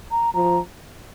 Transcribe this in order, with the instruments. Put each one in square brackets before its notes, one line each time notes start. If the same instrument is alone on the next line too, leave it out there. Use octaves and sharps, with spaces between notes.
[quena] A#5
[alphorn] F3 [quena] A#5